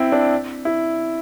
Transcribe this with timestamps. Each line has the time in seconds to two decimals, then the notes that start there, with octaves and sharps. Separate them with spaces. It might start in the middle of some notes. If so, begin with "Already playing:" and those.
Already playing: C4 E4
0.12 D4
0.65 E4